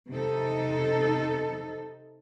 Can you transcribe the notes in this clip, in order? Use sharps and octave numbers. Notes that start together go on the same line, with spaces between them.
C3 D#4 A4